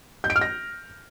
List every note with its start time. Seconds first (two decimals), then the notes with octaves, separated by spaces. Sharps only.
0.24 G6
0.30 D7
0.36 F6
0.41 A#6